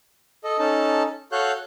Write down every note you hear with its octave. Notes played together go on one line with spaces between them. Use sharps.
A4 D#5
C#4 D#4 A4 A5
F#4 A4 C#5 F5 F#6 G6